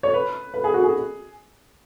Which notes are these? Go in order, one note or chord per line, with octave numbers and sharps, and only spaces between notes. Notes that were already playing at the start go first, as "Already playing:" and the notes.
C#5
B4
B4
G#4
F#4
G#4